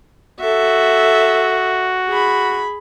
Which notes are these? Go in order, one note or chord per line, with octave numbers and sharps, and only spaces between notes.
F#4 A4 E5
G#4 B5